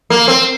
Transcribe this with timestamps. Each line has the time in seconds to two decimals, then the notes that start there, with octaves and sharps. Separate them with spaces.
0.10 A#3
0.28 C4